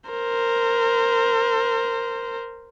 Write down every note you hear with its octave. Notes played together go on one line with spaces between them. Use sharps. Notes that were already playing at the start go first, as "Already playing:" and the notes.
A#4 C5